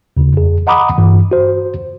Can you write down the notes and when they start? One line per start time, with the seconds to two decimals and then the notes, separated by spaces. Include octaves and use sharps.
0.17 D#2 C#3
0.34 F2 G#4
0.67 D#5 F#5 A#5 B5 D6 D#6
0.98 G2 E3
1.31 F#4 C5